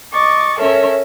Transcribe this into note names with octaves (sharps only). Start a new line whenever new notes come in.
D#5 C#6 D6 A6
C#4 A4 A#4 C#5 E5